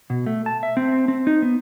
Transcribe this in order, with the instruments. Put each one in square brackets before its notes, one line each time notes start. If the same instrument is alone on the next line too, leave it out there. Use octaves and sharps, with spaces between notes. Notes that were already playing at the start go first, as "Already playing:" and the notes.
[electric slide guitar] B2
A3
A5
E5
C4
C4
D#4
B3